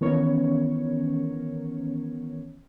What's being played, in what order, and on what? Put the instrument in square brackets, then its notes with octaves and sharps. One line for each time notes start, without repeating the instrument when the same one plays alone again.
[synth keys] D#3 E3 B3 C#4 A#4 C#5